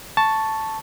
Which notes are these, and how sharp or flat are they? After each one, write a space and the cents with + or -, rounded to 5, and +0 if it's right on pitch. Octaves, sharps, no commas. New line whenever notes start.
A5 +0 C#6 +0